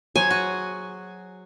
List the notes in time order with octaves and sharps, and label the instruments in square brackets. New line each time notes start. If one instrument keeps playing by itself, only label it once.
[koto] F#3 G#4 C5 [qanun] G#5
[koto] F#4